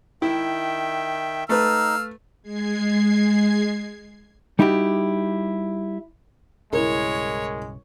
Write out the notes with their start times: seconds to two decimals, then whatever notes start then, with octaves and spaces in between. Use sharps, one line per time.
0.22 D#3 E4 E5 G5
1.49 A3 D#4 B4 F5 E6
2.43 G#3 G#6 C7
4.59 G3 D#4 E4 F#4 G4
6.73 B1 G2 C#3 G#3 E4 A#4 C#5